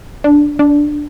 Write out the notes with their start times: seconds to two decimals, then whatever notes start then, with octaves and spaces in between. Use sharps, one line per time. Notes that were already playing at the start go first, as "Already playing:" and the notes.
0.24 D4
0.59 D4